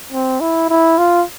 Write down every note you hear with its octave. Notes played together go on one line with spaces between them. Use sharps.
C4
E4
E4
F4